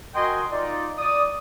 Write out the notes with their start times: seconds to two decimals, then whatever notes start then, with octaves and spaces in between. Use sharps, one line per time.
0.15 F#4 A#4 D#5 G5 G#5 C6
0.51 D#4 F4 D5
0.98 D5 D#6